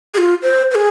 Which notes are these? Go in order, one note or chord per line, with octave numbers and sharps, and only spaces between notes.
G#4
F4
C5
C5
G#4